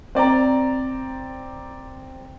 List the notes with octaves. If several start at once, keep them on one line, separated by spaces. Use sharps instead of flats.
C4 D5 G5 A#5